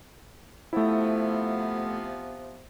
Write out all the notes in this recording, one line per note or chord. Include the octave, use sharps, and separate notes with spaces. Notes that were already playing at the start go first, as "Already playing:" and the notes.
C3 F3 A3 B3 E4